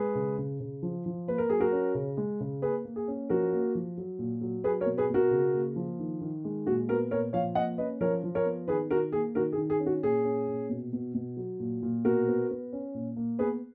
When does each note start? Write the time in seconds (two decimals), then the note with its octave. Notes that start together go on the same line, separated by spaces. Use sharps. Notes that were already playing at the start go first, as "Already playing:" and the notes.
Already playing: G#3 G#4 B4
0.15 C#3
0.38 C#3
0.60 C#3
0.83 F3
1.06 F3
1.27 A#3 B4
1.38 A#4
1.49 F#3 G#4
1.60 F#4 A#4
1.72 C#4
1.95 C#3
2.17 G#3
2.40 C#3
2.62 A#3 G#4 B4
2.85 A#3
2.96 G#4
3.08 C#4
3.29 F3 F#4 A#4
3.53 A#3
3.75 F3
3.98 F#3
4.19 A#2
4.41 F#3
4.64 F#3 G#4 B4
4.81 A#4 C#5
4.86 B2
4.97 G#4 B4
5.10 B2 F#4 A#4
5.31 C#3
5.53 A#3
5.76 F3
6.00 D#3
6.21 D#3
6.44 G#3
6.66 A#2 F#4
6.89 B3 F#4 A#4
7.11 A#2 A#4 C#5
7.33 F3 C#5 F5
7.55 A#3 D#5 F#5
7.78 C#4 B4 D#5
8.01 F3 A#4 C#5
8.24 F3
8.35 A#4 C#5
8.45 B3
8.68 D#3 G#4 B4
8.90 D#3 F#4 A#4
9.12 A#3 G#4
9.35 D#3 F#4 A#4
9.52 G#4
9.57 D#3
9.70 G#4
9.80 C#4
9.86 F#4
10.03 A#2 G#4
10.25 C#4
10.48 A#2
10.70 B2
10.93 B2
11.14 B2
11.37 F#3
11.60 A#2
11.83 A#2
12.05 B2 F#4 A#4
12.28 B3
12.50 B3
12.73 C#4
12.94 A#2
13.16 A#3
13.39 B3 G#4 B4